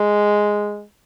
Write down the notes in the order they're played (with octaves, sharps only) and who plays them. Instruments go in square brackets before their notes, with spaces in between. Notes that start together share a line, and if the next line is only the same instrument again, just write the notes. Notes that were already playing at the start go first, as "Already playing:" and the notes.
Already playing: [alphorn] G#3